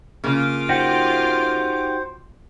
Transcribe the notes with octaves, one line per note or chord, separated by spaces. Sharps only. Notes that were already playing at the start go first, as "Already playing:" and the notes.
C#3 A#3 F4 D6
D#4 F#4 G4 C5